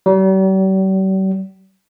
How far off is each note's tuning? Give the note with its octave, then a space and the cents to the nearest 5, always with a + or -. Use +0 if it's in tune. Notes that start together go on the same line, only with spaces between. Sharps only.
G3 -45